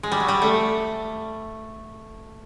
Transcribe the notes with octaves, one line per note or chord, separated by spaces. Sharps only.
G#3
G3
F#3
G3
A3